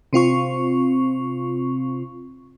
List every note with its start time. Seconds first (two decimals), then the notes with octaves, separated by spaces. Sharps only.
0.13 C3 C4 F4 C#6